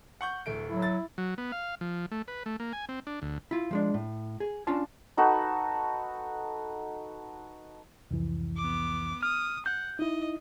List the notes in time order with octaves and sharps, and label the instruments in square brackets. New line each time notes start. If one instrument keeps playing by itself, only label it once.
[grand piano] F#5 C#6 G6
D1 A3 D7
[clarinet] F#3 [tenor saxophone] E4
[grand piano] A6
[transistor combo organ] F#3
B3
F5
F3
A3
B4
A3
A#3
G#5
C4
D4
D2
[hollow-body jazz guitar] E4 F4
F3 G#3 D4
A2
G#4
C#4 D4 F4 F5 A5
[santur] D#4 F#4 A4 B4
[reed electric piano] C2 F2 E3
[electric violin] B3 D6
[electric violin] D#6 [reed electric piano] F6
[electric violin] F#5 [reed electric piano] G6
[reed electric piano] D#4 E4 [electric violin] D#5